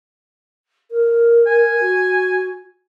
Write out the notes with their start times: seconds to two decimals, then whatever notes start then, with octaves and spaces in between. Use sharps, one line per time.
0.91 A#4
1.47 G#5
1.80 F#4